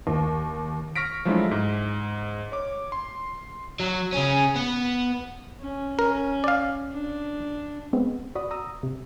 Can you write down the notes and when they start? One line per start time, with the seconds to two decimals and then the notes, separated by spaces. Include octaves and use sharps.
0.07 D#2
0.96 C#6 F6 A#6 B6 D7
1.25 F3 F#3 G#3 A3 D4 E4
1.51 G#2
2.52 C#5 D6
2.92 C6
3.80 F#3
4.13 C#3 C#4
4.56 B3
5.60 C#4
5.99 C#4 A#4
6.44 D5 F5
6.92 D4
7.93 G#3 B3 C4
8.35 F#4 D5 B5 D#6
8.51 A#5 D#6 E6
8.83 C3